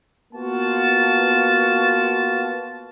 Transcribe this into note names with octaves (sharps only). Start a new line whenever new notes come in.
A#3 B3 F4 F#4 A5